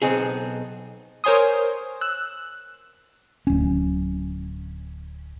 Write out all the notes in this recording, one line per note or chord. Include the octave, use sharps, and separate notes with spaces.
B1 E2 B3 C4 D#4 G#4
A#4 C5 C#5 G#5 C6 D#6
E6 F#6
D1 C#4